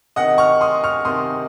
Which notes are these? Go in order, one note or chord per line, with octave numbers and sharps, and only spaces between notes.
C3 D#3 D#5 F#5
C#6 F6
C6 D#6
C#6 F6
C3 D#3 C6 D#6